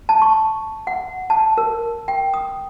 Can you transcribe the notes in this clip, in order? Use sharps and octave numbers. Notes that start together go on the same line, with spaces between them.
A5
C#6
F#5
A5
A#4
G5
D#6